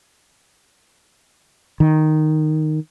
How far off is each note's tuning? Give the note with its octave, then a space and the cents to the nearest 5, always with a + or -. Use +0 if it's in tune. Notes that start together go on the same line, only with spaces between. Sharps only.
D#3 -5